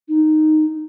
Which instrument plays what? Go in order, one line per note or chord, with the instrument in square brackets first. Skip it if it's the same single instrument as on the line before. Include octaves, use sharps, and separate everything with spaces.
[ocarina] D#4